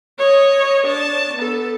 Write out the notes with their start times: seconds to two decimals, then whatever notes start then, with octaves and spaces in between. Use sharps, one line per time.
0.19 C#5 D#5
0.86 D4 A5
1.37 B3 A4